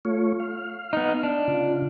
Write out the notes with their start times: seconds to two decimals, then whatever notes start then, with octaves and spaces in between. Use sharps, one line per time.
0.05 A3 F4 C#5
0.40 F5
0.93 B3 D#4
1.23 D4
1.48 C#3 F4